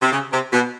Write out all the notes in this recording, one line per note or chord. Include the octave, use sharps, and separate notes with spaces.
C3
C#3
C3
B2